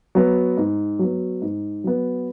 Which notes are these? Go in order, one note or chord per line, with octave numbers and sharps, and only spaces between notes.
F#3 B3
G#2
F#3 B3
G#2
F#3 B3